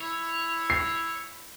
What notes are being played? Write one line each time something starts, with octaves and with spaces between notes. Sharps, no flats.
E4 C#5
C7